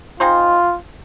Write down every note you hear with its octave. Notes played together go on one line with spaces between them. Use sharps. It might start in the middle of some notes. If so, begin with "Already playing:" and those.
C4 D#4 F4 G#4 C5